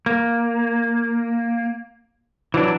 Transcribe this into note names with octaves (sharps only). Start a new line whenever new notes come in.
A#3
E3 F#3 D4